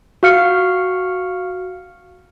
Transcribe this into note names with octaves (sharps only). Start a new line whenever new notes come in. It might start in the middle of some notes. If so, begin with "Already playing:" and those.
F#4 F5 F6 C#7